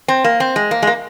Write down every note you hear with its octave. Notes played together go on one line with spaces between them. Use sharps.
C4
A#3
C4
G#3
A#3
G#3
A#3